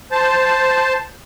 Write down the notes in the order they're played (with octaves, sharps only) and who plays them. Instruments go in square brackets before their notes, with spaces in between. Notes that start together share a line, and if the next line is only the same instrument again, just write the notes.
[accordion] C5 A5